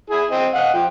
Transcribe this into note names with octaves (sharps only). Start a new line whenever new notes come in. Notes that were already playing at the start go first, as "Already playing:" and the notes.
E4 G#4
C4 D#5
D#5 F5 F#5
F3 G5